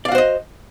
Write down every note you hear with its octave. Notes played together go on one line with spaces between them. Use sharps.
F#4 C5 D5 D#5 F5